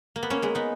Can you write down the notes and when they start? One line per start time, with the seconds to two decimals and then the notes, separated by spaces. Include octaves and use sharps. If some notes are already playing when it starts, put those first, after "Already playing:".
0.16 A#3
0.23 B3
0.30 A#3 C#4
0.42 G#3 B3
0.55 B3 D#4